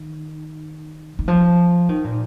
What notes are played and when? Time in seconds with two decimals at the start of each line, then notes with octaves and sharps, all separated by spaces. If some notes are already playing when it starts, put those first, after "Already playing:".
Already playing: D#3
1.19 D#3
1.28 F3
1.89 D#3
2.04 A#2